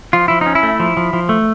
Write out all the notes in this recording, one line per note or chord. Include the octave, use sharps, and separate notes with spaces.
F3 F4
F3 E4
C#4 D#4
E4
A3
F3
F3
F3
A3